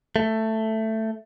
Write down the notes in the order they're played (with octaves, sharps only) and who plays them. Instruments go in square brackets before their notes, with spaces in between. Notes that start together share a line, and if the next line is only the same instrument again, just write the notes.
[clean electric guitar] A3